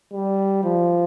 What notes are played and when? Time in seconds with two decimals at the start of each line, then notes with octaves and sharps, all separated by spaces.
0.12 G3
0.64 F3